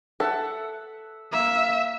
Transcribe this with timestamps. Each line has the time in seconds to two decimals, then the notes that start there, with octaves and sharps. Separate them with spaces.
0.20 A4 E5 F#5
1.33 A#3 E5